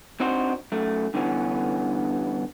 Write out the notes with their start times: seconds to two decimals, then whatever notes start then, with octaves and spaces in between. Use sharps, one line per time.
0.20 C4 D4 D#4 F#4 C5
0.72 F#2 A3
1.14 G2 D3 E3 B3 C#4